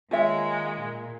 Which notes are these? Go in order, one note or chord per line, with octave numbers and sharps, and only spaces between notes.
D#3 G#3 A#3 F4 C#5 E5
A#2